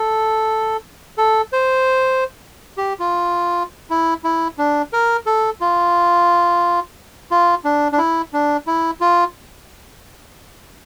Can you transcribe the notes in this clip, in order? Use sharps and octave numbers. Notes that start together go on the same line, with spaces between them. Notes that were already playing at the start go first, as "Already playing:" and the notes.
Already playing: A4
A4
C5
G4
F4
E4
E4
D4
A#4
A4
F4
F4
D4
D4
E4
D4
E4
F4